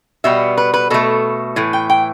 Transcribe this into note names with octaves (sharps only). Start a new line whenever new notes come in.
B2 G3 B3 E5
B4
B4
B2 A3 A4
A2 E3
G5
G5